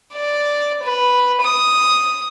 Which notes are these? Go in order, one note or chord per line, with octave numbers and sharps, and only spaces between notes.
D5
B4
D#6